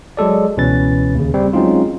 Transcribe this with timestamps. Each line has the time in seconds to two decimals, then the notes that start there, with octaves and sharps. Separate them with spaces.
0.17 F#3 G#3 A4 D5
0.57 C#2 B2 E3 C#4 B4 A6
1.15 D#2 C#3
1.34 G3 C4
1.53 F#3 G#3 C4 C#4 D#4 F4